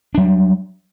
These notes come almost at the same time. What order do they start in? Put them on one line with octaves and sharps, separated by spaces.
D4 F#3 G3